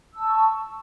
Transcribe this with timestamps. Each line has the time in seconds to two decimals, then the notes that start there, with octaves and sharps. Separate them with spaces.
0.13 E6
0.18 A5
0.22 C#6